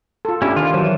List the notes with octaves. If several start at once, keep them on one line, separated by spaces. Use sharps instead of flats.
F4 A4
C#4 D4 E4 G4
D#3 F4
E3 F#3 C5